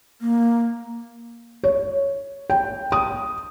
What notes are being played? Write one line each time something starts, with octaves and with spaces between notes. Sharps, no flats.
A#3
C#5
G5
D#6